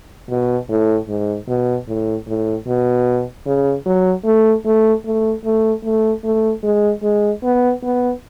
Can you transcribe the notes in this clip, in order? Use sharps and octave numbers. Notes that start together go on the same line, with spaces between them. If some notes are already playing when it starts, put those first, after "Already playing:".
B2
A2
G#2
B2
A2
A2
B2
C#3
F#3
A3
A3
A3
A3
A3
A3
G#3
G#3
B3
B3